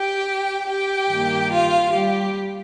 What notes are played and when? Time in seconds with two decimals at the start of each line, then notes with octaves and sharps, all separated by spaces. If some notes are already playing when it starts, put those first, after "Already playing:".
Already playing: G4 G5
0.69 G4 G5
1.10 G2 D#3 A#3
1.51 F4 F5
1.92 G3 G4